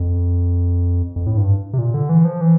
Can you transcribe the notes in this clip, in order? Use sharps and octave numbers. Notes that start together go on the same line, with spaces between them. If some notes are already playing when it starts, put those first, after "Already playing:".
Already playing: F2
F2
A2
G2
C3
A#2
D3
E3
F3
E3